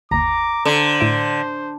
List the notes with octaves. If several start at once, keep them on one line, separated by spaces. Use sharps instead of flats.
G1 D#2 A#5 D6
D3 A4 C5
A2 E5 D7